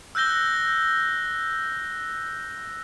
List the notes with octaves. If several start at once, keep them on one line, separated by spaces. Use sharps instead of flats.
E6 F#6 G6 A#6 G7